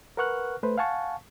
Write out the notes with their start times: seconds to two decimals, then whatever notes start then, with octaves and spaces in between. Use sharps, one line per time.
0.17 A#4 B4 F#5 C#6 F6 F#6
0.63 A3 B4 C5
0.78 F5 F#5 G#5 A5 C#6